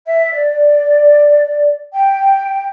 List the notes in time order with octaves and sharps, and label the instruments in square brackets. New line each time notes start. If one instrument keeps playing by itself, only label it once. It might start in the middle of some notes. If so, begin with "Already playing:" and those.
[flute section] E5
D5
G5